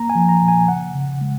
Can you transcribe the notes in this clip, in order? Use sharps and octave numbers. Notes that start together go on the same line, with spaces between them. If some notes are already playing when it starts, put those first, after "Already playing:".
Already playing: A#3 A#5
G#5
F3
A#5
A#2
G#5
C#3 F#5
C#3
G#3